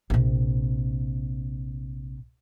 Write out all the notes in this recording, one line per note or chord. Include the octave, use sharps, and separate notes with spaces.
A#1 C3